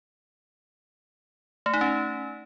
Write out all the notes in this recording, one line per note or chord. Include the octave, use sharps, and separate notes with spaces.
A3
D#4
C#4